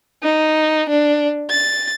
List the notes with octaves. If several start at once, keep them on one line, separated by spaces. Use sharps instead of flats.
D#4
D4
A6